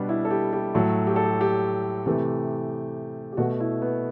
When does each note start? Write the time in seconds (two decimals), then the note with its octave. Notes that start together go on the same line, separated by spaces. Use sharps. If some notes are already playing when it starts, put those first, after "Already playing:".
Already playing: B2 G3 B3 D4
0.09 E4
0.25 A4
0.30 G4
0.53 G4
0.75 A2 F#3 A3 A4
1.07 G4
1.16 A4
1.24 G4
1.41 G4
2.06 C3 E3 A3 G4
3.33 G4
3.37 B2 A3 F#4
3.60 E4
3.82 B3